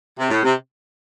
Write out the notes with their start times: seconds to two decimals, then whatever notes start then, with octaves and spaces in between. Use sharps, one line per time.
0.19 C3
0.30 A2
0.43 C3